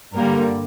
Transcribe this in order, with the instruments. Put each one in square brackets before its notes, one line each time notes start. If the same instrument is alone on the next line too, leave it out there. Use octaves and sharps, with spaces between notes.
[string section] G2 D3 G3 A#3 A#4